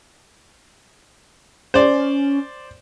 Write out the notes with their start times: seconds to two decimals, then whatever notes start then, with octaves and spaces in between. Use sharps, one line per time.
1.74 C#4 C5 D5